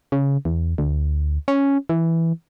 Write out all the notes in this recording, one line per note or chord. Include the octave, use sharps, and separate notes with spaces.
C#3
E2
D2
C#4
E3